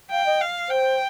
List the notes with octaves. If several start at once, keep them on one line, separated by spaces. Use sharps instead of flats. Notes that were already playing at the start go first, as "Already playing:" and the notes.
F5 G5
D#5
F5
C5 G5